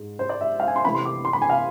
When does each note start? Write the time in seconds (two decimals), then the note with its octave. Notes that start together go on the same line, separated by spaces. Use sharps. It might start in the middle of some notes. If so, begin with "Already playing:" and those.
Already playing: G#2 G#3
0.19 C5
0.29 D5
0.41 E5
0.60 F5
0.68 G#5
0.76 C6
0.85 C3 E3 A3 B5
0.95 C6
1.06 D6
1.25 C6
1.33 B5
1.42 G#5
1.50 F5